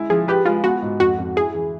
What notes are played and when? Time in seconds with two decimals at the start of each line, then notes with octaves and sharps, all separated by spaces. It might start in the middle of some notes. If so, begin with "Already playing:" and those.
Already playing: G#3 E4
0.10 F3 G#4
0.28 G4 B4
0.46 G#3 F4
0.64 B3 F#4
0.82 G#2
1.00 F2 F#4
1.18 F2
1.36 E4 G#4
1.55 E3